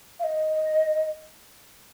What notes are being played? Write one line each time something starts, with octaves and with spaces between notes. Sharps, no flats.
F5
D#5